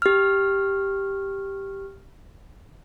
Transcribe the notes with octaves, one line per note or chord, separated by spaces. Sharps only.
G4 F6